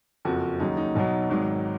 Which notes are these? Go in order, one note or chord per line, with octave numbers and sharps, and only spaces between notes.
F#1 F2 F3 F#4
D#2 C#3 F#3 D#4
D#4
B1 B2 F#3 D#4
G#1 G#2 D#3 F#3